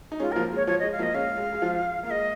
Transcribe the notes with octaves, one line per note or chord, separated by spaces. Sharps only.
D#4
G#3 C#4 F4
F3 A#3 A#4
G#3
C#5
F3 C#5
G#3 D#5
F5
F3 A#3
D#5
G#3 C#4 F5
G#3
G#3
F3
A#3 F5
G#3 D#5